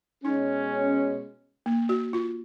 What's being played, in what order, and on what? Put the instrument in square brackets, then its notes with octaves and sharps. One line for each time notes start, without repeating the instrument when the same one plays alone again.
[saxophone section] B2 G#3 C#4 [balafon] D#4
[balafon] A#3
F#4
F4